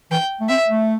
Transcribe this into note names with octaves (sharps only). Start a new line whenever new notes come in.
E3 G5
A3
C4 E5
A3